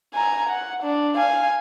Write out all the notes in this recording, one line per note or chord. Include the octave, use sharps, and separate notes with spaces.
G#5 A#5
F#5
D4
F5 G#5